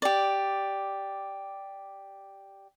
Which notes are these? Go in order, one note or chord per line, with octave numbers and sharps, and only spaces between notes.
G4 D5